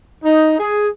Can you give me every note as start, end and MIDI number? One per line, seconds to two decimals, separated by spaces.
0.24 0.58 63
0.58 0.88 68